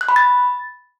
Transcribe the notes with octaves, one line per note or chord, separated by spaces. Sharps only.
F#6
B5
A6